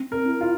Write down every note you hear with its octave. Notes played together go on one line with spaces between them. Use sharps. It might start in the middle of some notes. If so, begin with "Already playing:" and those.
Already playing: C4
A#4
E4
F4